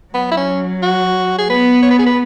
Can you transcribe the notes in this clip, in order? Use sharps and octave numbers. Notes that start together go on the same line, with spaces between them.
F#3 B3
E4
C#4
F#4
G#4
B3 B4
C#5
B4
G#4
B4